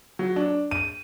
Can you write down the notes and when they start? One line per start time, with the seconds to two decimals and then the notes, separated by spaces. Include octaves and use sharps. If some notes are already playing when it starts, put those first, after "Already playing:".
0.19 F#3
0.36 D4
0.71 D#7